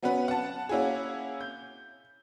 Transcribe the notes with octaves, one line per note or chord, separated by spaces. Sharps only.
F#3 B3 C#4 F#4 B4
F#5 A5
A#3 C#4 E4 F#4 G#4
G6